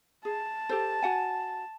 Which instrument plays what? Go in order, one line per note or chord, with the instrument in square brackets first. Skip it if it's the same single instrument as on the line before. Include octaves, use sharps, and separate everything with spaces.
[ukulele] G#4 [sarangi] A5
[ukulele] G4 A4 C5
F#4 F#5 G#5